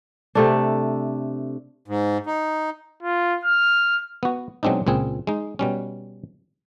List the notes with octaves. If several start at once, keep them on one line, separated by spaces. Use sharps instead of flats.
C3 A3 D4
G#2
D#4
F4
F6
B3 F#4
B2 F#3 G#3 C4 D4 D#4
C#2 A#2 C4 G#4
G#3 D#4
B2 G3 C#4